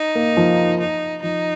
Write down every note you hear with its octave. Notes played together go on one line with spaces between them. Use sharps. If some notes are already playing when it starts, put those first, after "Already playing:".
Already playing: D#4
A#3
F3
D#4
F3 D#4